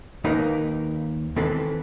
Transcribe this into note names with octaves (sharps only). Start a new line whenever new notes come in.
D#2 A#3 D#4 A#4 B4
D#3 E3 C4 A4 B4